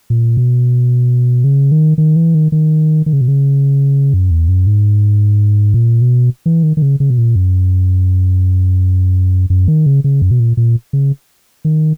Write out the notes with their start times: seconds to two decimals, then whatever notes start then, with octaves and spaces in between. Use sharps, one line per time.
0.10 A#2
0.37 B2
1.44 C#3
1.72 D#3
1.98 D#3
2.16 E3
2.35 D#3
2.52 D#3
3.06 D#3
3.13 C#3
3.21 B2
3.28 C#3
4.14 F#2
4.31 E2
4.48 F#2
4.67 G#2
5.74 A#2
6.02 B2
6.46 E3
6.63 D#3
6.77 D#3
6.82 C#3
7.00 C#3
7.10 B2
7.18 A#2
7.36 F#2
9.50 F#2
9.68 D#3
9.86 C#3
10.04 C#3
10.22 F#2
10.31 B2
10.40 A#2
10.57 A#2
10.93 C#3
11.65 D#3